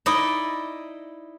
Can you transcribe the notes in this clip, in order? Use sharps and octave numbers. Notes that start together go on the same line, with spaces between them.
D#4 E4 D5 D#5